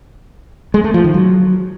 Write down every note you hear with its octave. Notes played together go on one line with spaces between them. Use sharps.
G#3
A3
F3
D#3
F#3